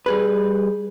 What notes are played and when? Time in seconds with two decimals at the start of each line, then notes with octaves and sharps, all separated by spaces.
0.06 G3 G#4 B4